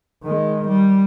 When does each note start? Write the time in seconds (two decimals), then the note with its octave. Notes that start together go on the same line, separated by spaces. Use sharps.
0.23 D#3 G#3
0.67 G3